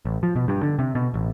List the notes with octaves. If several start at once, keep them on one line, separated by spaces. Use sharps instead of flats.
A1
F3
B2
G2
D3
C3
B2
A1